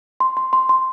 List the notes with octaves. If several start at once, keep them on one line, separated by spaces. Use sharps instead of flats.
C6
C6
C6
C6